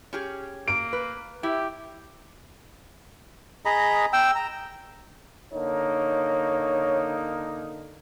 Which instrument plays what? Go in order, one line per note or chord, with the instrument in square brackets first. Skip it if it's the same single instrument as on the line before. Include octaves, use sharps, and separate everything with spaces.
[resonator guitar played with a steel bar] C#4 G4 G#4
[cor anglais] A#3 [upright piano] D7
[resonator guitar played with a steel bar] B4
[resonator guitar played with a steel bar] E4 [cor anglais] G4
[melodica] G#4 D#5 A#5 B5
G5 E6
A#5
[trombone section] D3 A#3 D#4 [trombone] C#5